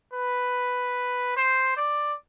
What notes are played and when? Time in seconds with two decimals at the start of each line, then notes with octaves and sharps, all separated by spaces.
0.13 B4
1.36 C5
1.76 D5